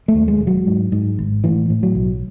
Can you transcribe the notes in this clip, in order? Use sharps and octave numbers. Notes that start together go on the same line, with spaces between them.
A3
D#2
G#3
E1
F#3
G#2
G#2
G#1
A2 E3
A2
F#3
B1